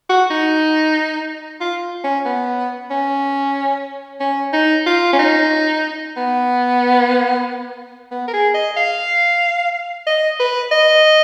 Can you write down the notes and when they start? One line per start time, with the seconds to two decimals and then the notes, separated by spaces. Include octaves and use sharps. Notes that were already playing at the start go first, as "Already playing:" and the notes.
0.09 F#4
0.30 D#4
1.60 F4
2.04 C#4
2.25 B3
2.90 C#4
4.20 C#4
4.53 D#4
4.86 F4
5.13 C#4
5.19 D#4
6.17 B3
8.11 B3
8.28 A#4
8.33 G#4
8.54 D#5
8.77 F5
10.07 D#5
10.40 B4
10.72 D#5